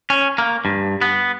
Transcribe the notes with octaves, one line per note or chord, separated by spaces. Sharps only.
C#4
A#3
G2
B3